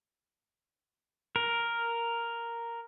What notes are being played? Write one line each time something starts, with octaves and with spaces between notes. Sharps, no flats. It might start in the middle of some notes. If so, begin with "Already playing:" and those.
A#4